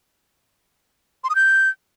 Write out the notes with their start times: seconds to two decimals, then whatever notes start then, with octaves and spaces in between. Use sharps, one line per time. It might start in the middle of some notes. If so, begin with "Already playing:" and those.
1.24 C6
1.30 D#6
1.35 G6